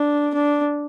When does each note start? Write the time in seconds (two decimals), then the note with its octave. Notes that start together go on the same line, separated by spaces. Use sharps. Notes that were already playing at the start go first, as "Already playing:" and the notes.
Already playing: D4
0.34 D4